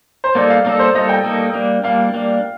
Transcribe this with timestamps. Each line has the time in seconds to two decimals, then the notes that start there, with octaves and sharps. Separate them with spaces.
0.24 C5
0.35 G3 A#3 D#4 A4 D5
0.50 F5
0.64 G3 A#3 D#4 A4 D5
0.79 C5
0.95 G3 A#3 D#4 A4 D#5
1.09 G5
1.23 G3 A#3 D#4 A4
1.54 G3 A#3 D4
1.84 G3 A#3 D4 F5
2.14 G3 A#3 D4